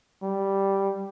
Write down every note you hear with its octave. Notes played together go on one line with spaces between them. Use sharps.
G3